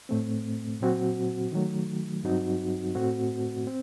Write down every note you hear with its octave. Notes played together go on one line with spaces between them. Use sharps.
A2 A3 C4
A#2 F#3 C4 F#4
D#3 F#3 A3
G2 F#3 C4 D#4 F#4
A2 A3 C4 F#4
C4